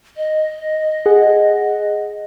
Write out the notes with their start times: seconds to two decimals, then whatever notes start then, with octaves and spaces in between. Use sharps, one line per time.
0.17 D#5
1.06 G#4 F#5